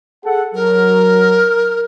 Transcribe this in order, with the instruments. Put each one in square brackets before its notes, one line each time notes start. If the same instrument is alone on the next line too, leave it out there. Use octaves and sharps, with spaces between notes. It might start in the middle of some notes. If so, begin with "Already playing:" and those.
[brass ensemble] G#4 A4 F#5
[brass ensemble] F#3 [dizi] A#4